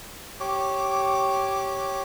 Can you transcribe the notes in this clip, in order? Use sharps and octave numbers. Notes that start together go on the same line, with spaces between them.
G4 C#5 D6